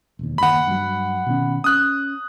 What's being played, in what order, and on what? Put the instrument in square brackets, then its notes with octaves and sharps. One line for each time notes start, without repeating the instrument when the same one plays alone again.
[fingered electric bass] E1 D#2
[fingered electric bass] F#1 D#2 [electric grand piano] F#5 B5
[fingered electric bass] G2 F#3
B2 D#3 C#4
[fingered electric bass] C#4 [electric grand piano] D#6 F#6